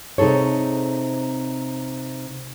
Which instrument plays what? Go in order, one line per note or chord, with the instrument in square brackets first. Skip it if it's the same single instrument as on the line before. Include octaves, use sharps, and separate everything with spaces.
[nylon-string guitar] C3 D#4 G#4 A4 C#5